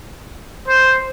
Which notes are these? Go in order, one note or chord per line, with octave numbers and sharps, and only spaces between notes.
C5